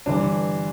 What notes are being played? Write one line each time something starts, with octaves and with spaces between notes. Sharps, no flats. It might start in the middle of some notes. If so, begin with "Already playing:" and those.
G1 G2 E3 G3 D4